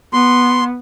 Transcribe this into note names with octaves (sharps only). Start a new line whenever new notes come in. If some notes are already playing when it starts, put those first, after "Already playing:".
B3 C6